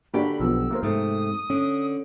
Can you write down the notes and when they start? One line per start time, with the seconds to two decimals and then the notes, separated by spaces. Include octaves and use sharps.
0.14 D3 A#3 D4 F#4 G4 B5
0.40 B1 F3 B3 E6
0.71 A#3 A#4 C5
0.83 G#2 C3 A3 C4 D#6
1.50 D3 C#4